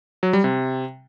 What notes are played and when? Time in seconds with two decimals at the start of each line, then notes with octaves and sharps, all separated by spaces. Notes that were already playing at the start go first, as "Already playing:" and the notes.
0.23 F#3
0.33 G3
0.44 C3